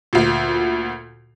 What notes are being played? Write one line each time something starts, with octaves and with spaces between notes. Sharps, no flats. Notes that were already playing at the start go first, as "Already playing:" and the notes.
D2 A#2